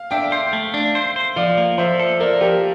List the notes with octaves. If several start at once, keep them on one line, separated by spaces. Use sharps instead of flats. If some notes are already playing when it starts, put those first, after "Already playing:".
Already playing: F5
D4 E5 G5
C5
A3
D4
C5
C5
F3 D5 F5
A#3
F3 C5 E5
A4
A#3 A#4 D5
F3 G4 A#4